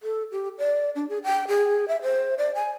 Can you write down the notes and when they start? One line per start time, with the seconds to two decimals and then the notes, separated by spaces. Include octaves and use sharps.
0.03 A4
0.32 G4
0.58 D5
0.96 D4
1.09 G#4
1.24 G5
1.48 G#4
1.88 E5
2.02 C5
2.38 D5
2.55 G#5